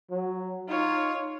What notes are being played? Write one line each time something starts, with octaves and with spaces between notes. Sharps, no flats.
F#3
D#4 F4 C#5